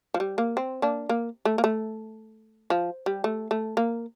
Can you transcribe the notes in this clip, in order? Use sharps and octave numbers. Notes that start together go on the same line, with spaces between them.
F3
G3
A#3
C4
A#3 D4
A#3
A3
A#3
A3
F3
G3
A3
A3
A#3